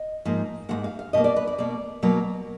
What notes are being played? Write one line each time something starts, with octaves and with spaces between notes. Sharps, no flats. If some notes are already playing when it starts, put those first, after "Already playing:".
Already playing: D#5
G#2 F3 A#3
G#2 F3 A#3 F#5
F5
F5
B2 A#3 D#5
D5
B4
D5
B2 A#3 D5
B2 F#3 A#3